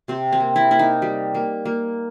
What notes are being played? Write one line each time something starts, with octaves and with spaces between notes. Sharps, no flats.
C3 C4
C4
A#3
E4
A#3 E4
D#4
G3
A#3
A#3